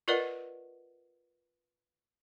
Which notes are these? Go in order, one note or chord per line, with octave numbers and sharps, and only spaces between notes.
F4 A#4 B4 D5 D#5 F#5